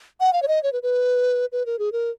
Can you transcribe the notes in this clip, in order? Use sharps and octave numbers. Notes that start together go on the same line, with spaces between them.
F#5
F5
C#5
D#5
C#5
B4
B4
B4
A#4
G#4
A#4